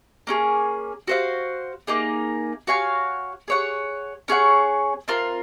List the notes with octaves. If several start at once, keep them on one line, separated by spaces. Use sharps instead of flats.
A#3 C#4 G#4
F#4 C5 F5
A#3 D#4 G#4
F#4 C#5 F5 G#5
G#4 C#5 F#5
C#4 G#4 C#5 F#5
C4 F4 A#4